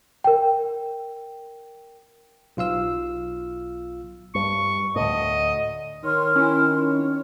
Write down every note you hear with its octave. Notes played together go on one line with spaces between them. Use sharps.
A#4 G5
B1 F4 F5 E6
G2 C#6
D2 A2 D#5
D#3 C#5 C6 F6
C#4 E4
C#5